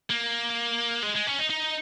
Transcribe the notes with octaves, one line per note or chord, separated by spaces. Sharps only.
A#3
G#3
G#3
C#4
D#4
D#4